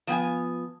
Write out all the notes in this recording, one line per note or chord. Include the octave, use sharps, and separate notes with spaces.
F3 B3 G5 G#5